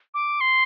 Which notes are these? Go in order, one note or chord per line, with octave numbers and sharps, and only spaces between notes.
D6
C6